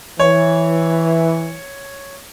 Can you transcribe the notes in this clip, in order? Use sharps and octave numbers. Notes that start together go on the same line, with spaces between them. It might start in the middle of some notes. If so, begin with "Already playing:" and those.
E3 C#5